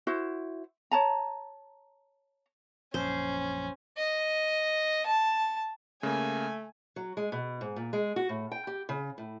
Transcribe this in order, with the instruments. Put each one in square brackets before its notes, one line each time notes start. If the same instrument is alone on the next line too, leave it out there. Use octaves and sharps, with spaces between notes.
[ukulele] E4 F#4 C5
C#5 A5 A#5
[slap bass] A#1 F#2 [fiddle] C#4 [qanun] C5
[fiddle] D#5
A5
[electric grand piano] C#3 A#3 [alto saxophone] A3 [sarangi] G#5
[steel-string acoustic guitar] F#3
G#3
B2
G#2
A#2
G#3
F#4
A2
G5
G4
C#3
A2